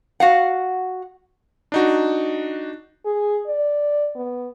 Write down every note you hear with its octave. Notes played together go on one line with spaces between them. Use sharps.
F#4 F5 F#5
D4 D#4 F#4
G#4
D5
B3